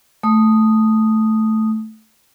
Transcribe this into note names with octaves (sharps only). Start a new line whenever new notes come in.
A3 D#6